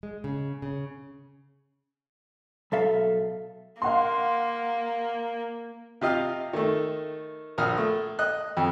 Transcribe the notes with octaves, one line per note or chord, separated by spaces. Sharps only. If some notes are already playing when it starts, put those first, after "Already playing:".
G#3
C#3
C#3
B1 B2 A4 E5 F5
A#3 F5 F#5 C6
C3 F4 D#5 F5
D#3 A3
A#1 D#6 F6
A3
D#5 F#6
F2